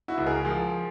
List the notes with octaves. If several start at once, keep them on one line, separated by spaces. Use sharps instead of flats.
E4 F#4
C#2
G#4 A#4
F3